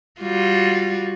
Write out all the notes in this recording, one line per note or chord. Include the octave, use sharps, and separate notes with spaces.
G3 F4 F#4